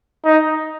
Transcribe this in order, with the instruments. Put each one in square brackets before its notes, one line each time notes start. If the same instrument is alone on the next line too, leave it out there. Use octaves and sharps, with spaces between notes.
[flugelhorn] D#4